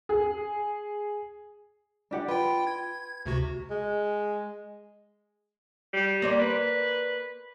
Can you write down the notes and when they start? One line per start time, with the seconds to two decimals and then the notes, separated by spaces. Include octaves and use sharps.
0.09 G#4
2.11 D4 G4 F#5
2.28 F4 B4 G5
2.67 G#6
3.26 D2 C3 F#4
3.70 G#3
5.93 G3
6.22 A#3 C5 D5
6.40 B4